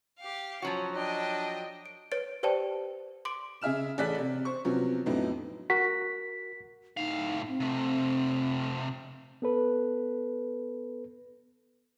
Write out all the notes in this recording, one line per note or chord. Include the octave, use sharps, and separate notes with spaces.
G4 F5
F3 F#3 C#4 F#4
D4 D#5 G5
D7
B4 C#5 A6 D7
G4 B4 C5 D5 G5 A5
C6 D6 D7
C#3 G#4 E5 F6 E7
A1 G#4 A4 D5 F#6 B6
C3 D5
C5 C#6
C3 F3 F#3 B3 C#4
F2 A2 F#3 B3 D4 D#4
F#4 A#4 B6
A2 D#4 F5
C4
C3 A3
B3 A4 B4